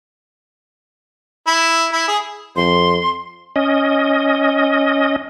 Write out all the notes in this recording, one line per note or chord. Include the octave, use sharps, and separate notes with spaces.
E4
E4
G#4
F2 C6
C#4 D#5